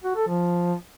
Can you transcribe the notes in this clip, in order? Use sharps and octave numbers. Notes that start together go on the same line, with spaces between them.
F#4
A4
F3